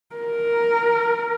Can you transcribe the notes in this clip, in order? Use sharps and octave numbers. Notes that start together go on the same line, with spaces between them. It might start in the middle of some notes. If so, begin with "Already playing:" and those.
A#4